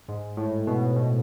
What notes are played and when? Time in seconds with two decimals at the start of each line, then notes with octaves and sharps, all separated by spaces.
0.08 G#2
0.37 A2
0.67 B2
0.96 B2